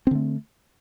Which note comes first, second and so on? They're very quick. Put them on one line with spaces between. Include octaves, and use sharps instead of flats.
C4 D3 A3